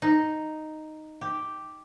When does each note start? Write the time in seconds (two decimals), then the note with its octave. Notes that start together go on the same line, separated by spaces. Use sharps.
0.02 D#4
1.21 G4